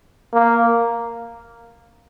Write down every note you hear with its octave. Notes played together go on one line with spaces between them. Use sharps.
A#3